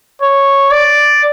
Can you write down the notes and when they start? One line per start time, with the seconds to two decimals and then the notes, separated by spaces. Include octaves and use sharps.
0.22 C#5
0.71 D5